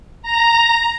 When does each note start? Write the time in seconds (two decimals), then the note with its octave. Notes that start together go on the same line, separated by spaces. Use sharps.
0.22 A#5